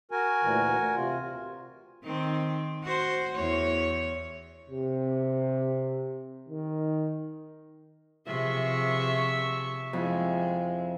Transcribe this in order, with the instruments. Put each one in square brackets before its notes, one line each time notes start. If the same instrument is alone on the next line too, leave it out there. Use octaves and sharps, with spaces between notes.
[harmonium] F#4 A#4 G#5
[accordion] D2 A#2 E3
C3 F4
[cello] D#3 C4
F#4 C5
E2 C#5
[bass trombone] C3
D#3
[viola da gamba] C3 F3 G#4 [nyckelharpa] E5 C#6
[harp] F2 E4 G#5 [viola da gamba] G#3